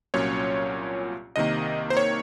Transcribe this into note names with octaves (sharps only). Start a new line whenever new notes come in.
C2 A#2 F#3 C#4 F4 C#5
C2 C3 D#3 A#3 D#5
C5
C#5